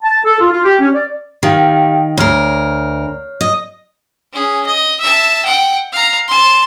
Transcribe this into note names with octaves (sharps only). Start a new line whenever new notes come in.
A5
A4
F4
F4
G4
C#4
D5
D#3 G4 F5 G5
D2 A#4 C#5 F6 C7
D#5
C#4 G#4
D#5
E5 A5
F#5 G5
F5 A#5
A5 C6